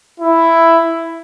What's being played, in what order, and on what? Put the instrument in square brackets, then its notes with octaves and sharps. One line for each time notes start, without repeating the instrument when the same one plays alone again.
[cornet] E4